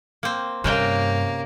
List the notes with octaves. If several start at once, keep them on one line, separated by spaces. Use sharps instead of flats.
A#3 C4
G2 C3 A#3 C#4 G5